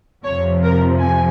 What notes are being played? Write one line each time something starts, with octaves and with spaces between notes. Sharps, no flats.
F2 C3 F3 C#5
A#4
G#5